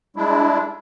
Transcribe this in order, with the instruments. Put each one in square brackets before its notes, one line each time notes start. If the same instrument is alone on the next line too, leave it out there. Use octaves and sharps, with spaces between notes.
[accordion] G3 G#3 D4 E4